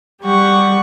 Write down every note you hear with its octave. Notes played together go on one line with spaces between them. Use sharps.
G3 G4 F#5 C#6